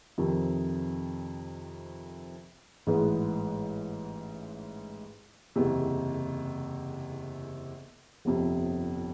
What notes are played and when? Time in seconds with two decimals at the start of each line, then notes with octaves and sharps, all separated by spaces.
0.18 F2 C3 D#3
2.87 A1 G#2 E3 G#3 B3
5.56 F#1 E2 C3
8.25 G1 F2 C3